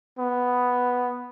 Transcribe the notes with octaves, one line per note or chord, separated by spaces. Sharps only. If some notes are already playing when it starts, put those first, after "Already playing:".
B3